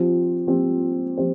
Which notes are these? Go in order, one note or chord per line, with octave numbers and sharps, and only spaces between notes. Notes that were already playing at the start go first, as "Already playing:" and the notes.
Already playing: F3 C4 G4 C5
F3 C4 G4 C5
F3 C4 G4 C5